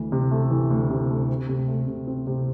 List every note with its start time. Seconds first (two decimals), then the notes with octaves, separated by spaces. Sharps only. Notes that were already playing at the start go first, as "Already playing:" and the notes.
Already playing: D2 E3
0.12 C3
0.31 A3
0.51 E3
0.70 D2
0.90 C3
1.10 A3
1.29 C4
1.49 C3
1.68 A3
1.87 C3
2.07 C4
2.27 C3